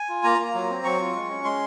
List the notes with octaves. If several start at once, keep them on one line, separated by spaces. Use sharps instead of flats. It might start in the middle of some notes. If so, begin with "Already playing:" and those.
Already playing: G#5
F4
A#3 A#5
A#3
F#3
C4
F#3 C#6
F4
G#3
C#4
G#3 C6